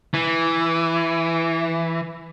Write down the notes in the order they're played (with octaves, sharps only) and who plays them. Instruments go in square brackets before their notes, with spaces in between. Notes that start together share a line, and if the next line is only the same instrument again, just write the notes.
[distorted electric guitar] E3